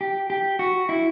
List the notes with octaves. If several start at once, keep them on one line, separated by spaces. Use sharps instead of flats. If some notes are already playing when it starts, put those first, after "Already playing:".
G4
G4
F#4
E4